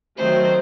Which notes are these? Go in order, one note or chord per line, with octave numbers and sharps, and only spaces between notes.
D#3 F#3 A3 C4 C5